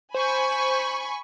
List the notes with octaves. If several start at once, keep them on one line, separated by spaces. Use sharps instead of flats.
C5 G#5 B5 C#6